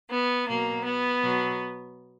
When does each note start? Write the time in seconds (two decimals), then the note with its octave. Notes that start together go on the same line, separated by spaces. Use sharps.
0.10 B3
0.48 B2 F#3 A#3
0.85 B3
1.21 B2 F#3